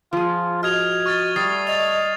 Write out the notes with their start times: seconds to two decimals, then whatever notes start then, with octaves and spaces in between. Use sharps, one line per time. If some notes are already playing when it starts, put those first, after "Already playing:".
0.13 F3 F4 G#4
0.63 F#4 D#5 F6 G#6 F7
1.06 C#6 F6 A6
1.36 G3 A3 D#6 A6 C7
1.67 D#5 A6 F7